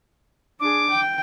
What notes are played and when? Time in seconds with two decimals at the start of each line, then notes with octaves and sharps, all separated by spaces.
0.60 D4 G#4 D6
0.90 G5